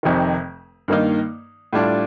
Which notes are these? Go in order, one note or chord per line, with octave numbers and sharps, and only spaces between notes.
F1 F2 C3 D#3
G2 D#3 A#3 D#4
A2 G3 D4 F4